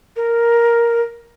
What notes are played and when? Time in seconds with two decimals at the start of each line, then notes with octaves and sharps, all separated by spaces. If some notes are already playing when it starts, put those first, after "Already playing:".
0.16 A#4